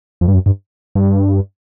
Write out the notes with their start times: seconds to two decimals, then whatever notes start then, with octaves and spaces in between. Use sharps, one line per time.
0.21 F2
0.28 G2
0.34 F#2
0.46 G2
0.95 G2